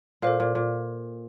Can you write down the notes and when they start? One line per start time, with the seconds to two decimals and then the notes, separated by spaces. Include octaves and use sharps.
0.22 A#2 A4 C5 F5
0.40 A#2
0.55 A#2